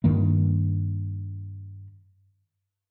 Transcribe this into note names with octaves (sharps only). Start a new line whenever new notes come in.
G2 D#3 A#3